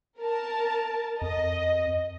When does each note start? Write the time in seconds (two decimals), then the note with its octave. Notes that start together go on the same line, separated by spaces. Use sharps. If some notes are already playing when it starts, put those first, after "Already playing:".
0.21 A#4 A5
1.22 F2 D#5